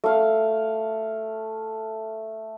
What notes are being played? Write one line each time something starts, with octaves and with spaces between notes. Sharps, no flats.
A3 F5